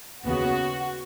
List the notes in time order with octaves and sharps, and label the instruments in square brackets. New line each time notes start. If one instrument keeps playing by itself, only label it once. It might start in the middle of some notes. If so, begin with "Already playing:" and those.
[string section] D#2 C#3 B3 F#4